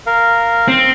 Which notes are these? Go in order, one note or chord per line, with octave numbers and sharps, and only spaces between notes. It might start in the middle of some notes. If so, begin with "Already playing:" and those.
A#4 F5
C4